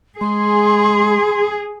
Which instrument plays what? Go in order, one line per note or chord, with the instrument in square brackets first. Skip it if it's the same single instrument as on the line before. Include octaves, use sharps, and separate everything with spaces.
[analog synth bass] G#3 [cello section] G#4 [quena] C6